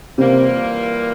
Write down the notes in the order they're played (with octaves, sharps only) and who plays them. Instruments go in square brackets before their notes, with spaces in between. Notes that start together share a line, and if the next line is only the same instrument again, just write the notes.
[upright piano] C3 [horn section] E3 G3 A#3 F4